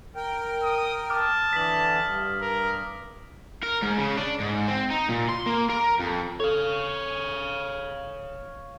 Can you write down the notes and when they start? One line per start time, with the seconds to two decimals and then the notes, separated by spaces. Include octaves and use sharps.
0.16 A#4 G5
0.63 D#6
1.10 A5 D6 D#6 F6
1.53 D3 E3 B6 F#7
2.04 G2
2.41 A#4
3.63 A#4
3.83 G#2
3.98 C#3
4.17 D4
4.40 G#2
4.68 C4
4.90 D#4
5.09 A#2
5.29 C6
5.46 A#3
5.70 A#4
5.99 F2
6.40 A4 C#5 F5